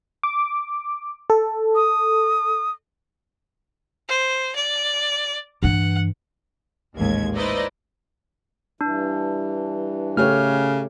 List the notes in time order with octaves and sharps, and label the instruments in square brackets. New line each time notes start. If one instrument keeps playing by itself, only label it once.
[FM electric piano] D6
A4
[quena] D#6
[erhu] C5
D5
[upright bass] G2 E3 [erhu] F#5
[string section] A1 D#2 G#2 G#6
D#4 E4 B4 C5 D5 D#5
[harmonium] G2 E3 [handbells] D4
[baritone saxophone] C#3 [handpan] A3 G4 C#5 [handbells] F6